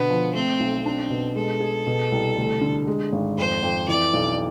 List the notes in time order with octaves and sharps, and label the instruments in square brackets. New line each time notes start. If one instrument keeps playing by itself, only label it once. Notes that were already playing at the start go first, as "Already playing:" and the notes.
Already playing: [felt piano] B2 D3 [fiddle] B3
[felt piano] F3
[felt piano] A3 [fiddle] C4
[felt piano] B1
[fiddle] C4 [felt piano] D4
[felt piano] B2
[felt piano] G#3 [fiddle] A4
[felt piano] G#4
B2
C2
D2
D3
G#3
G#1
[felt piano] F2 [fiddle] C5
[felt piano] F2
[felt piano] E3 [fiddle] D5
[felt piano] B1